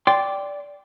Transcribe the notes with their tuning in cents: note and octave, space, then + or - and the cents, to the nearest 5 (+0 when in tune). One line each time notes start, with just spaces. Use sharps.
D5 -10 G5 +0 C6 +0